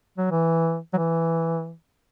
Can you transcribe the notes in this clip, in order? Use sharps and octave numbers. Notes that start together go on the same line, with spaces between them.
F#3
E3
F#3
E3